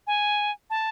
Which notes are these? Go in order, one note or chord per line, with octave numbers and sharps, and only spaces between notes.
G#5
A5